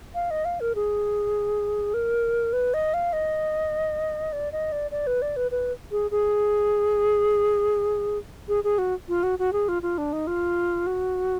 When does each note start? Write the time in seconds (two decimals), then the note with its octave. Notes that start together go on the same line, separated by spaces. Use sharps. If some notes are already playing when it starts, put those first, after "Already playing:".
0.15 F5
0.31 D#5
0.45 F5
0.60 A#4
0.75 G#4
1.94 A#4
2.53 B4
2.74 D#5
2.94 F5
3.13 D#5
4.33 D5
4.52 D#5
4.72 D5
4.91 D5
5.07 B4
5.22 D5
5.36 B4
5.51 B4
5.91 G#4
6.11 G#4
8.49 G#4
8.64 G#4
8.78 F#4
9.09 F4
9.23 F#4
9.39 F#4
9.53 G#4
9.68 F4
9.82 F4
9.98 D4
10.13 D#4
10.27 F4
10.87 F#4